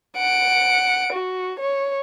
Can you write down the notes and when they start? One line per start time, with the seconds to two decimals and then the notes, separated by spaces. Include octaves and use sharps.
0.17 F#5 D7
1.13 F#4
1.59 C#5